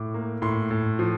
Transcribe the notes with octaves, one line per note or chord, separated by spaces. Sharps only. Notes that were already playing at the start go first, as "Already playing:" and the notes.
Already playing: A2 D6
A#3
A2 C6
A2
F3